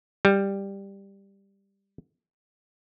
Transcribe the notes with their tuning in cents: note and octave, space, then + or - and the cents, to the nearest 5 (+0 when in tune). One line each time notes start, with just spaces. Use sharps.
G3 +10